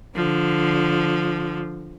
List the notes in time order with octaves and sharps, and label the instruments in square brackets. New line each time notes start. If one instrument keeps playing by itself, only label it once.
[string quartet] D3 F3